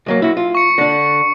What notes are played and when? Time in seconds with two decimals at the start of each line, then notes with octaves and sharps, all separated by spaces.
0.06 B1 F#3 A#3
0.22 E4 F#4
0.37 F4
0.55 C#6 C#7
0.78 D3 D4